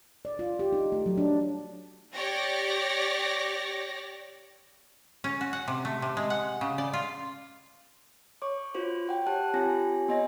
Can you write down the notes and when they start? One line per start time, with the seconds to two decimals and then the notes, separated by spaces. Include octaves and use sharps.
0.25 D5
0.39 F4
0.59 G4
0.73 D#4
0.92 A3
1.06 F#3
1.18 D4
2.13 G4 C#5 D5 A#6
5.24 C#4
5.41 F#4
5.53 F#5
5.68 C3
5.85 A3
6.02 C3
6.17 G#3
6.30 F#5
6.61 C#3
6.78 D5
6.93 F4
8.42 C#5 C#6 D6
8.74 F4 F#4 C5 C#5
9.07 C#5 F#5 G5
9.27 G4 C#5 A5 F#6
9.54 C4 F4 G4 C#5 G#5 A#6
10.08 B3 C#5 D#5 G#5 A#6